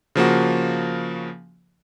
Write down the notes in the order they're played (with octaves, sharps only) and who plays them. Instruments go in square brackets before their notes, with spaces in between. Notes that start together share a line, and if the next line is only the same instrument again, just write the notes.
[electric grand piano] C#3 F3 A#3 F#4